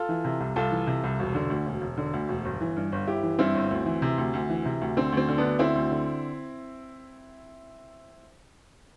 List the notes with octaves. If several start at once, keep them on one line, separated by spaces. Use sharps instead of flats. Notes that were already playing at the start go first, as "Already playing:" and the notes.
Already playing: F4 A4
E3
C3
C2
C2 F4 A4
E3
C3
C2
E1
D3
D2
E1
E1
D3
D2
E1
G1
E3
G2
G1
G1 E4 G4
E3
G2 C4 E4
G1
D2
E3
C3
D2
D2
E3
C3
D2
D3 C4
D2 C4
D3
B3 D4
D2
D3 C4 E4
D2
D3